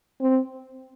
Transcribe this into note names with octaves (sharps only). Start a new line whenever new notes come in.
C4